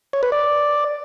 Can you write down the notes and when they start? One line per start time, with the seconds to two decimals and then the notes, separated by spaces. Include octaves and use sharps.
0.13 C#5
0.23 B4
0.32 D5